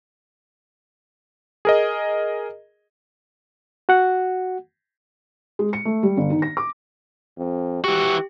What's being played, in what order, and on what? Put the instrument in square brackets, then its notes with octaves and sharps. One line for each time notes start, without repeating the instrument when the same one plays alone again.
[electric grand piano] G#4 A#4 D#5
[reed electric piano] F#4 F#5
[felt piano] G#3
C#7
A3
G3
G1
D#3
A#6
D6
[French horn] F2
[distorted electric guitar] E3 F#4 [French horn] G4